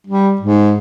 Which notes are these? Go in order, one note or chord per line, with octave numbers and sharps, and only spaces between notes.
G3
G#2